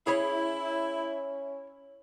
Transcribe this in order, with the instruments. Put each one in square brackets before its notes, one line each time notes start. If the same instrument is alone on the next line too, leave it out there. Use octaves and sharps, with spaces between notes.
[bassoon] C#4 [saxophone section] E4 [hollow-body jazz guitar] G#4 C#5 B5